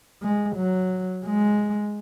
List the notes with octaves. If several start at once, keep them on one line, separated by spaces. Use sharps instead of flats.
G#3
F#3
G#3